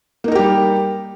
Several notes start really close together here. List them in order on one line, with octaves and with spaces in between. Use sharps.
A#3 D#4 A#4 G4 G3